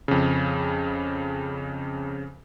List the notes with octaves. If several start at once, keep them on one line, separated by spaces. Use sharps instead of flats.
F2 C#3